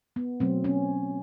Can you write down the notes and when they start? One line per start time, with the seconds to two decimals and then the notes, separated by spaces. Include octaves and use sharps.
0.16 B3
0.40 B2 F#3 A3 C4
0.64 C#4